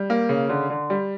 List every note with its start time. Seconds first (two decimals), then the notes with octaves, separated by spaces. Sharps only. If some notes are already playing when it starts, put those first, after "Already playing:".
Already playing: G3
0.10 A#3
0.29 C#3
0.49 D3
0.70 D3
0.90 G3